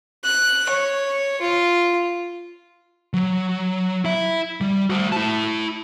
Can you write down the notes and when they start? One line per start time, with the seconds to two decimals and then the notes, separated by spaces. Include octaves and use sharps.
0.24 F#6
0.70 C#5
1.41 F4
3.14 F#3
4.05 E4 E5
4.61 G3
4.90 F#4 C5
5.12 E4 A5